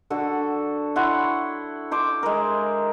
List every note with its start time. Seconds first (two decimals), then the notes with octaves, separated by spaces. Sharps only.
0.10 D3 F#4 A4
0.96 E4 C#5 F#5 C6
1.91 C5 C6 D6
2.23 G#3 A#4